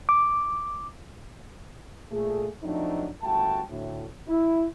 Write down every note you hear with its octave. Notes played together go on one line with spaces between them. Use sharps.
D6
A#2 A3 G#4
F3 F#3 A3 C4 D4 D#4
G1 C#2 A3 F#4 G5 A5
D2 A2
E4